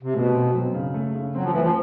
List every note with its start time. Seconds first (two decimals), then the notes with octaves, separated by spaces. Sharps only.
0.03 C3
0.14 B2 A3
0.34 C4
0.54 F#3
0.74 C#3
0.94 A3
1.15 C#3
1.35 F#3 C4
1.43 F3
1.52 E3 A3
1.61 F3